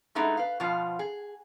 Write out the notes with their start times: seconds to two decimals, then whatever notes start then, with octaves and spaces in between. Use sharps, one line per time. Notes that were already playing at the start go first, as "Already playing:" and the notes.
0.15 G#3 A3 B3 D#4 E4 G#4
0.37 B4 F5
0.60 B2 F3 B3 F4 F5
0.99 G#4